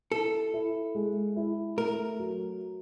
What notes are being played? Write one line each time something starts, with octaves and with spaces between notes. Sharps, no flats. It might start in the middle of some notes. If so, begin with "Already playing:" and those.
E4 A4
E4
G#3
E4
A3 A#4
F#3